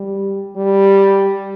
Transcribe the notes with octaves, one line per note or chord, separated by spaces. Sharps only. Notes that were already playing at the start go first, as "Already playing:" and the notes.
Already playing: G3
G3